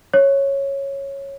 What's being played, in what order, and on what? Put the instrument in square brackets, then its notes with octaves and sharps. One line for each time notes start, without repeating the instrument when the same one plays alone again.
[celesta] C#5